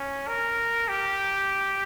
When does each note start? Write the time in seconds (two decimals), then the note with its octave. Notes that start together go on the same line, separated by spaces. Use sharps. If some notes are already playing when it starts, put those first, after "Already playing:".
Already playing: C#4
0.28 A#4
0.88 G4